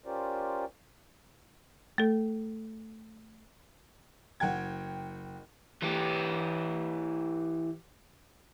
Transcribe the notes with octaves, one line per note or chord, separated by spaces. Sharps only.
C#4 F4 G4 A#4 C5 D5
A3 A4
F#1 F#5 G5 G#6
E3 G4